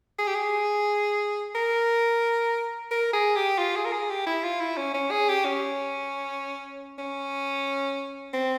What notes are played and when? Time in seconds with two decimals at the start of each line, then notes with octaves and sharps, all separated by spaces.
0.19 G#4
0.27 G4
0.35 G#4
1.55 A#4
2.91 A#4
3.13 G#4
3.36 G4
3.59 F4
3.76 G#4
3.86 A#4
3.92 G#4
4.10 G4
4.27 E4
4.44 F4
4.61 E4
4.77 C#4
4.94 C#4
5.11 G#4
5.29 G4
5.45 C#4
6.99 C#4
8.33 C4